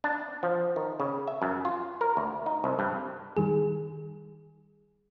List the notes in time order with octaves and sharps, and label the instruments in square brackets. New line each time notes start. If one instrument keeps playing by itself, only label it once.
[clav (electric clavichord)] D4
F3
D#3
C#3
E5
F#2
F4
A#4
D2
D#4
C2
G2
[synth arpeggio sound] D#3 G3 G#4